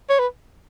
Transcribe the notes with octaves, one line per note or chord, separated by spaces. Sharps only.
C#5
B4